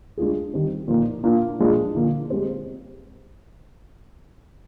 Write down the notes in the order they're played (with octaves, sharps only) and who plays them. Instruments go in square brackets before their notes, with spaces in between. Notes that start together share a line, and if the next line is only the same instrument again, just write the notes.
[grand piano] G#3 D4 F4 G#4
D#3 G3 C4
A#2 F3 A#3 D#4
A#3 D4 F4
A#2 F3 G#3 D4 G#4
D3 F3 A#3
G#3 C4 G4 C5